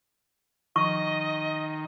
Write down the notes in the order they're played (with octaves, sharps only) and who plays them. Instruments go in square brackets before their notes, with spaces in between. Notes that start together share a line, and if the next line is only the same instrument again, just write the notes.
[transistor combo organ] D#3 [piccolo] D#5 [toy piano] C#6